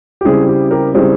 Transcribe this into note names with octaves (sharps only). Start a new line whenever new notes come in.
G4
C#3 G3 C4 E4 G#4
G4
G4 A#4
C#3 G3 C4 E4 G#4